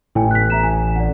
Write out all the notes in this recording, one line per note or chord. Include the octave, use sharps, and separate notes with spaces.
A1 E4 G5 G#5
F#6 B6
E5 A#5 E7
G#5
D5 F#5